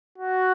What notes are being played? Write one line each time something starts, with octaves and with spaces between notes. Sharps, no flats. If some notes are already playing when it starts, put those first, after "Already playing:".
F#4